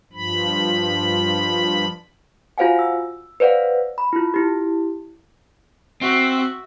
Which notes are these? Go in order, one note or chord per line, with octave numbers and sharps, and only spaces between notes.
G2 F3 B5
F4 F#4 C5 F5 F#5 G#5
E6
B4 C5 D5 F5 F#5
B5
E4 F4
E4 G4
C4 F#4 E5